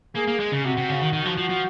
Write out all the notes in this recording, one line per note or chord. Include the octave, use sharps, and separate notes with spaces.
A#3 G#4
A#3
G#3
C#3
C3 F#4
C3
C#3
D#3
D#3 F#4
F3
F3
F3